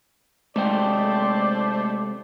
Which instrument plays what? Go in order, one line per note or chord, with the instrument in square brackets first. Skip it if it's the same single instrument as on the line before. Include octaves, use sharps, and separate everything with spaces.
[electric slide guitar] C3 G#3 G5 [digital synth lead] A3 [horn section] C5 A5 [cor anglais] D5